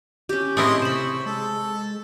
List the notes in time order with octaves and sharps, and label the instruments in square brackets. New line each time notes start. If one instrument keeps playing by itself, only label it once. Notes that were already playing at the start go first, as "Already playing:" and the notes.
[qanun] C#4 G4
[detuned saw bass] A2 [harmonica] G#3 D#5 C6 [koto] A3 C4 E4
[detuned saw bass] C3 [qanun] C5 B5 [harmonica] C#6
[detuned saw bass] G#3 [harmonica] A4